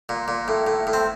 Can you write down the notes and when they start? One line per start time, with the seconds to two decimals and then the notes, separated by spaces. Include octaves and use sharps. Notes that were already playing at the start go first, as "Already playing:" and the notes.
0.09 A#2
0.28 A#2
0.48 A2
0.67 A2
0.87 A2
0.93 C4